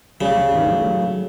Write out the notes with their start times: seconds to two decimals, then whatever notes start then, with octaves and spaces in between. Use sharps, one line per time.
0.21 D2 C#3 G3 C#4
0.52 A1 G2 D#3
0.69 F#3 G#3 A3